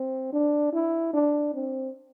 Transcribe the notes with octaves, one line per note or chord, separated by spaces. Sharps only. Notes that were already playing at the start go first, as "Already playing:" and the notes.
Already playing: C4
D4
E4
D4
C4